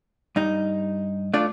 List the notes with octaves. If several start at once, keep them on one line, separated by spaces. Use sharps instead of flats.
G2 D#4
A3 D4 F4 D5